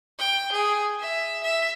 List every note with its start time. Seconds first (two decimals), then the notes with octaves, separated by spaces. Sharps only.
0.19 G5
0.52 G#4
1.00 E5
1.43 E5